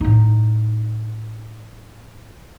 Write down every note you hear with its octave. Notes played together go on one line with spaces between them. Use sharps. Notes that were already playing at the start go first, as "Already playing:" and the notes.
A2 D#4